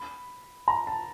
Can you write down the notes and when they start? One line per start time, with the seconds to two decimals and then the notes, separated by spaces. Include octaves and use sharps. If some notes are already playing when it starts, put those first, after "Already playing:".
Already playing: B5
0.68 A#5
0.87 A5